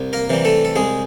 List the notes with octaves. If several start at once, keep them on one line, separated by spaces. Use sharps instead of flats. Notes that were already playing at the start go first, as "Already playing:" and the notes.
Already playing: C2
A#3 A#4
C3 E3 G3
A3 A4
A4
C2 G#3 G#4